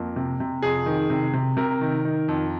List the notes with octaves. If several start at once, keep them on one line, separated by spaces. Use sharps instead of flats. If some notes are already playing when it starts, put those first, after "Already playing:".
Already playing: F2 A#3
C3
C3
F2 G#4
D#3
C3
C3
C3 A#4
D#3
D#3
F2